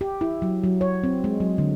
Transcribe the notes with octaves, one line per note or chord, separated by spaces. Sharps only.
G4
E4
F#3
F#3
C#5
C4
G#3
F#3
D3